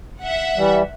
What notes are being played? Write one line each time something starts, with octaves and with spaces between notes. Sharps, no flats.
E5 F#5
E3 G3